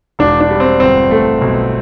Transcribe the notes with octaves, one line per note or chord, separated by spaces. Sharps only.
E1 D4
D4
G3
C4
G1 C4
A3
B1